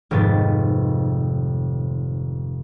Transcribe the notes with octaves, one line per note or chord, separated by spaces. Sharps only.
F1 G#2 C3 D#3 B3 A6